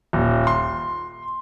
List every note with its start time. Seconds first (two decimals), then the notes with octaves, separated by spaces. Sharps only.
0.13 D#1
0.47 C6